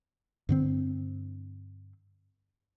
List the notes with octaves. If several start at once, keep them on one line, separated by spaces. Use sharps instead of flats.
G2 D3 C4